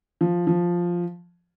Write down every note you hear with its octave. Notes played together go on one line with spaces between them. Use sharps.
F3
F3